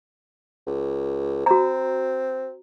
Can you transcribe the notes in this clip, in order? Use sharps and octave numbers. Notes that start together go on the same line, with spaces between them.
C#2
C4 F#4 A#5